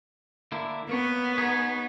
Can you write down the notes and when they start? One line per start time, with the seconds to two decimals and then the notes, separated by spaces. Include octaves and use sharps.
0.52 D3 A#3 E4
0.89 A#3 B3 C#5
1.38 D#4 G#4 C#5